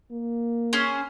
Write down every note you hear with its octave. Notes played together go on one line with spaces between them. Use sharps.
A#3
C#4 G#4 C5